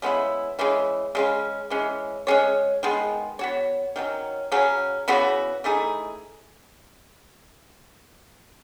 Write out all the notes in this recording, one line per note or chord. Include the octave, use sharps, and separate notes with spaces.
C#3 G#3 B3 E4
C#3 E3 G#3
C#3 G#3 C#4
E3 G#3 C#4
G#3 C#4 G#4 C#5
D#3 G#3 B3
B3 F#4 C#5
D#3 F#3 C#4
C#3 F#3 C#4
C#3 E3 B3 F#4
E3 A3 D#4 G#4